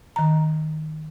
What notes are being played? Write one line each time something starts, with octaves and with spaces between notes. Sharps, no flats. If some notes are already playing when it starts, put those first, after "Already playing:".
D#3 A#5